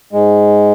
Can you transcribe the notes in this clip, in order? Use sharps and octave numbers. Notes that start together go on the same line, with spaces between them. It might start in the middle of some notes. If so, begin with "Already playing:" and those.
G#2 G#3